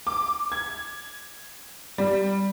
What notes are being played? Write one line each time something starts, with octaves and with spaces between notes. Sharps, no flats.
D6
G#6
G3